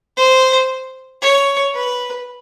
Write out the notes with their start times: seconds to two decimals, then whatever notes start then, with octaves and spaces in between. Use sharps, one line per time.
0.17 C5
1.22 C#5
1.74 B4